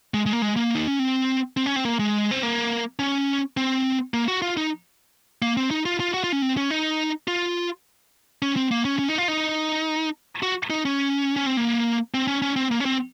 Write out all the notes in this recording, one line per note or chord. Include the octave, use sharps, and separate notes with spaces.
G#3
G#3
A#3
G#3
A#3
D#4
C#4
C4
C4
C#4
C4
A#3
G#3
C4
A#3
C#4
C4
A#3
F#4
F4
D#4
A#3
C4
D#4
F4
F4
F#4
F4
C#4
C4
C#4
D#4
F4
C#4
C4
A#3
C#4
C#4
D#4
F4
D#4
F#4
D#4
C#4
C#4
C4
A#3
C4
C#4
C#4
C4
A#3
C#4
C4